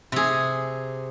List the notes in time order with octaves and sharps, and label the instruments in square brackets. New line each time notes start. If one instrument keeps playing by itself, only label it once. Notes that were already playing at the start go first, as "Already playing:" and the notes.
[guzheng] C3 G#4